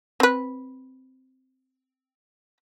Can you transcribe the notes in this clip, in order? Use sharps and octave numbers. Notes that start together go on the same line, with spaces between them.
C4 B4